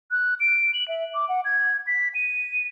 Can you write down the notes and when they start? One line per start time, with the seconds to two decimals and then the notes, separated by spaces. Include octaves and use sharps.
0.11 F#6
0.40 D7
0.74 F#7
0.88 E5
1.15 D6
1.29 F#5
1.45 G#6
1.87 B6
2.15 D#7